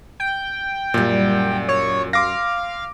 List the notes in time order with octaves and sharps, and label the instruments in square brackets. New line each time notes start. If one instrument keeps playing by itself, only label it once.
[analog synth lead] G5
[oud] F#2 G3 [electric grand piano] A#2
[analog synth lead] C#5
[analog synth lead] F5 [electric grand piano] C6 D6 A#6